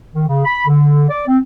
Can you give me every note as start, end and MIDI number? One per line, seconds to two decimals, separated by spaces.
0.15 0.26 51
0.28 0.41 49
0.45 0.64 83
0.67 1.06 50
1.09 1.26 74
1.27 1.38 60